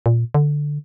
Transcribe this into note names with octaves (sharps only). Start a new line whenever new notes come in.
A#2
D3